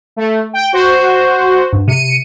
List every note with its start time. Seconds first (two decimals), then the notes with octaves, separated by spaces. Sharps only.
0.16 A3
0.53 G5
0.73 F#4 C5
1.73 G2
1.88 C3 C#7 D#7